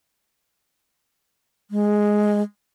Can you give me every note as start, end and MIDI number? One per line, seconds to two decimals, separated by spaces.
1.71 2.42 56